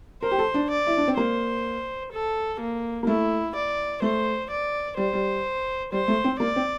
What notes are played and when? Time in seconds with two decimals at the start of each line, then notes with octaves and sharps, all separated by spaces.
0.22 A#4 C5
0.31 G4
0.39 A4
0.54 D4
0.70 D5
0.87 E4
0.97 D4
1.08 C4
1.17 A#3 C5
2.12 A4
2.60 A#3
3.03 A#3
3.07 A3 E4
3.55 D5
4.02 A3 C5
4.50 D5
4.97 G3 C5
5.13 G3
5.92 G3 C5
6.08 A3
6.24 C4
6.40 A#3 D5
6.56 C4